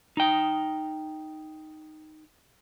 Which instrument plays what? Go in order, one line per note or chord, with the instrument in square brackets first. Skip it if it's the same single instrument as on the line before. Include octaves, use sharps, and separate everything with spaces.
[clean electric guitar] D#4 G5